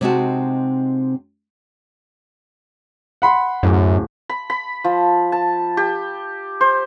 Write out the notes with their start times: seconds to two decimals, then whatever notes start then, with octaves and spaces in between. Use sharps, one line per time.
0.01 C3 G#3 C4 D#4 F#4 A5
3.22 F#5 B5 C6
3.63 D1 F#2
4.29 B5
4.50 B5
4.84 F3
5.32 A5
5.77 G4
6.61 C5